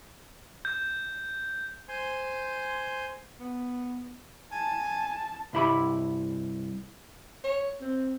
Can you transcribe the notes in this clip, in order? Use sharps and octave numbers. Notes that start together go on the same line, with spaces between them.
G6
C5 G#5 C6
B3
G#5 A5
A5
C2 G2 E4 G4 B5
C#5
C4